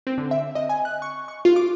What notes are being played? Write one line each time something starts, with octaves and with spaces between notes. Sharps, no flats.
C4
D3
E5
D#5
G#5
F#6
C#6
C#6
F4
D6